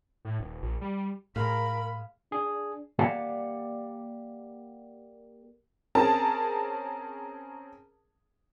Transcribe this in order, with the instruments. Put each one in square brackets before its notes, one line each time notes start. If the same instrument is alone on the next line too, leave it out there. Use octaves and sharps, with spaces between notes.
[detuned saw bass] A2
D#1
A#1
G3
[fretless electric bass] A2 [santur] G#3 F5 [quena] A#4 [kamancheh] B5
[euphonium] D4 [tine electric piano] G#4
[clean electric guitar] A#3 G4 D5 F5 F#5
[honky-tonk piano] C4 C#4 G#4 A#4 A5